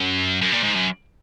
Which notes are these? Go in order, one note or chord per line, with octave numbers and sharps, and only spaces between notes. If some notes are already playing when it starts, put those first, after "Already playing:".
Already playing: F#2
F#2
A#2
G#2
F#2